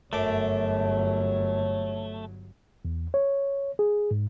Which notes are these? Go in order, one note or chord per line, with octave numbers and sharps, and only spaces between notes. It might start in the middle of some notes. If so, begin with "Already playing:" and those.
G1 F#2 F#3 A3 C#5 A5 D6
E2
C#5
G#4
G#2